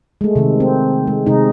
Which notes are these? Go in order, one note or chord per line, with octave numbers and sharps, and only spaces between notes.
G#3 A3
C3 D#3 G#3
C4
G#3
C3 G#3 D#4